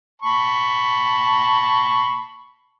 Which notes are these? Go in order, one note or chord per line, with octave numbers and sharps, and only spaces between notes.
A5 B5 C#6